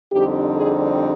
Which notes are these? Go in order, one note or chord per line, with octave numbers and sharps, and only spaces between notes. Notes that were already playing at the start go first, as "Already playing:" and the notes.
F2 D3 G3 C4 D#4 G4
G#4